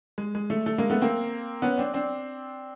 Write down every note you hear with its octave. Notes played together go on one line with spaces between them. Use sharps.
G#3
G#3
A3
A3
G#3 A#3
A3 B3
A#3 C4
B3 C#4
C4 D4
C4 D4